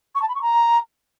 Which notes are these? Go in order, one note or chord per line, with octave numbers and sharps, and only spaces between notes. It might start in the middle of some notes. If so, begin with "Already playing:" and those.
C#6
A5
B5
C#6
A#5